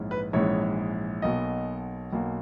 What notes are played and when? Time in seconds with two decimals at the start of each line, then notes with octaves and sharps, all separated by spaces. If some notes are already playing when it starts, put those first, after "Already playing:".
Already playing: A#1 G#2 E3 G#3 C#4
0.11 B4
0.33 A#1 G#2 E3 G#3 C#4 C#5
1.22 B1 B2 A#3 D#5
2.13 B1 B2 A#3